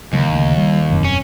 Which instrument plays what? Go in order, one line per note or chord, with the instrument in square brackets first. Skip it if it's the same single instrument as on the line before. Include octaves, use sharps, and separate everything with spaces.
[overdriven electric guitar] D#2 [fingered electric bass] C#3 F#3 G#3
[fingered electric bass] D2 C#3
G3
E1 F#2 C4
[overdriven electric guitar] C#4